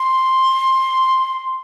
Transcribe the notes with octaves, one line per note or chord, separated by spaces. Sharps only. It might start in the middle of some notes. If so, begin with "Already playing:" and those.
Already playing: C6